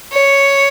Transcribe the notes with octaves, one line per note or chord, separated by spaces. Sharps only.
C#5